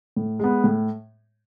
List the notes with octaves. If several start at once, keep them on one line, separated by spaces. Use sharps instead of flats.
A2
G#3 B3
A2